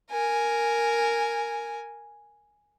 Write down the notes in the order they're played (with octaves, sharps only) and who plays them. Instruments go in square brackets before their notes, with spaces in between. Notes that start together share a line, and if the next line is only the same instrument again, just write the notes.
[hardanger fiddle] A#4 G#5